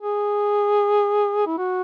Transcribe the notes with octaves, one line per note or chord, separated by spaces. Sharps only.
G#4
E4
F#4